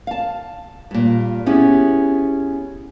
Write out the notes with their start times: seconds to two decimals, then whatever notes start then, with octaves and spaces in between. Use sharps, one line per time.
0.07 F5 A5
0.91 G2 A#2
1.46 B3 C#4 E4 G4 G#4